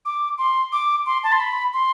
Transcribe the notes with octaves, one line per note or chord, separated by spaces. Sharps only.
D6
C6
D6
C6
A5
C6
B5
C6